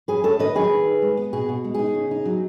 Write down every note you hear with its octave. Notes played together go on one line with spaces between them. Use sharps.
F#2 G#4 B4
A3 A4 C#5
D#3 B4 D#5
F#3 G#4 B4
D#3
D#4
G#3
B3
B2 G#4
B2
G#3
D#4 G#4
C#3
D#4
F#3